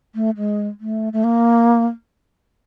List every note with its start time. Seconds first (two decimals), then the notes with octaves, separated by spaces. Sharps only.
0.15 A3
0.37 G#3
0.80 A3
1.13 A3
1.24 A#3